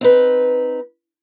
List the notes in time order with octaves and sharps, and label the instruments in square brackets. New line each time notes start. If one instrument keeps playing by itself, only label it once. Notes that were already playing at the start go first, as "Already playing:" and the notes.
[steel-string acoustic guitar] C4 D#4 B4